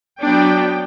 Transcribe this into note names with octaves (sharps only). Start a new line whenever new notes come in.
F#3 B3 D4 G5